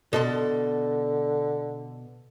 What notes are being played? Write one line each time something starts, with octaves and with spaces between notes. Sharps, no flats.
B2 D3 A4 C6